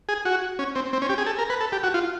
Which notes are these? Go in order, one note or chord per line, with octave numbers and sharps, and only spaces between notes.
G#4
F#4
C#4
C4
C4
C#4
G4
G#4
A4
A#4
B4
A4
G4
F#4
F4